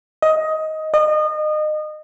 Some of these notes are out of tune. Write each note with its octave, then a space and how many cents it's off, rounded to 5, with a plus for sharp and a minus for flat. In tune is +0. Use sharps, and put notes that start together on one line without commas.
D#5 +15
D#5 -30